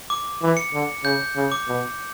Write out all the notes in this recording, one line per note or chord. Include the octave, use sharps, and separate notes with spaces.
D6
E3
C#7
D3
C#3 G6
C#3
D6
B2